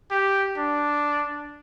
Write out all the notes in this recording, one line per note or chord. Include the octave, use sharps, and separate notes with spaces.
G4
D4